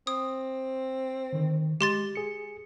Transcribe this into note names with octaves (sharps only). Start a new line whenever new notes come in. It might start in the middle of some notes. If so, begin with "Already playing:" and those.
C4 D#6
D3 D#3
G#3 G4 C6 A6
G#4 C#7